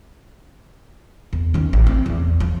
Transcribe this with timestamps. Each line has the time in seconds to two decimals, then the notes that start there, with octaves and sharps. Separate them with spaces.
1.33 E2
1.54 D#3 C#4
1.73 A1
1.87 C4
2.06 E2
2.40 F3